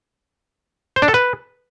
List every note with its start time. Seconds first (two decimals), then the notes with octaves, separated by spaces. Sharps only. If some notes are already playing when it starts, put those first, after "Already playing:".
0.96 C5
1.02 D4
1.08 A4
1.14 B4